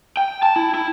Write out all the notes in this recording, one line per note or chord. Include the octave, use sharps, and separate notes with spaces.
G5
A5
E4
E4